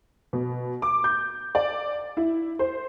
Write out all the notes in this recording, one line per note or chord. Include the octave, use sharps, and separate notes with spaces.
B2
D6
G6
D5
E4
C5